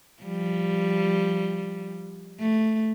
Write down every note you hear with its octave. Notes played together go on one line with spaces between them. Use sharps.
F3 G3
A3